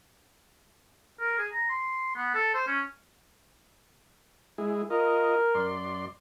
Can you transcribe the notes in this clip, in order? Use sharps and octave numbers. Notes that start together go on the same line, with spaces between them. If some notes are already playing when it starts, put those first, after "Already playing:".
A#4
G#4
A#5
C6
B3
A4
C5
C#4
G#3 E4 G#4
F4 A#4 D#5
F#2 D5 C6